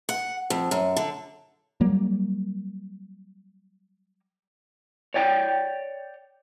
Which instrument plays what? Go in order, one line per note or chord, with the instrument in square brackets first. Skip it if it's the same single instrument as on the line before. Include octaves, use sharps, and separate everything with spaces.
[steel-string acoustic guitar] F#5
F2
F#2
D3
[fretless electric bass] F#3 G3 A#3
[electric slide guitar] C#5 D5 G5